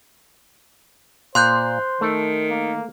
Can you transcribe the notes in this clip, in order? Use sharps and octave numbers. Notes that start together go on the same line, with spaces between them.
A#2 C5 C6 F#6 G6
D#3 A3
A#3